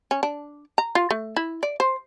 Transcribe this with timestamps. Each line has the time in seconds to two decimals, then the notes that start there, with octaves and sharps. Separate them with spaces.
0.11 C#4
0.23 D4
0.78 A#5
0.95 F4
1.11 A3
1.36 E4
1.63 D5
1.80 C5